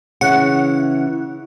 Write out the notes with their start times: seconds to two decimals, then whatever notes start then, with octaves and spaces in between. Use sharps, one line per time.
0.21 C#3 E3 F#5